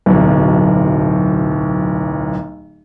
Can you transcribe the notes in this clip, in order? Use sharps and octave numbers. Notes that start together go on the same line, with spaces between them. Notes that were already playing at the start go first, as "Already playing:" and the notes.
D1 B1